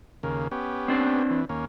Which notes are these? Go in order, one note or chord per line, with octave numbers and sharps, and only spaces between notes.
D#2 C#3 A#3
B3 C#4 G4
C4 D4 C5
E3
D#2 A#3 C#4